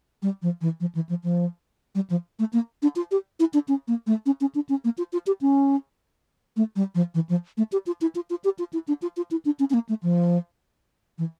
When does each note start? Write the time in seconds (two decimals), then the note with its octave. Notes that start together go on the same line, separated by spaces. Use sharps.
0.22 G3
0.42 F3
0.61 E3
0.80 F3
0.95 E3
1.09 F3
1.24 F3
1.95 G3
2.10 F3
2.39 A3
2.53 A#3
2.82 D4
2.96 F4
3.11 G4
3.40 E4
3.54 D4
3.68 C#4
3.88 A#3
4.07 A3
4.26 C#4
4.41 C#4
4.55 D4
4.69 C#4
4.84 A#3
4.98 F4
5.13 F4
5.27 G4
5.41 C#4
6.56 A3
6.76 G3
6.95 F3
7.14 E3
7.29 F3
7.57 A3
7.72 G4
7.86 F4
8.01 E4
8.15 F4
8.30 F4
8.44 G4
8.59 F4
8.73 E4
8.88 D4
9.02 F4
9.17 F4
9.31 E4
9.45 D4
9.59 C#4
9.70 C#4
9.74 A#3
9.89 A3
10.03 F3
11.18 E3